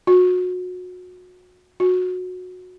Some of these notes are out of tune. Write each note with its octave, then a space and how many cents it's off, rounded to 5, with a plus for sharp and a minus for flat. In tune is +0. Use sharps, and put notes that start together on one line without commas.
F#4 -30
F#4 -20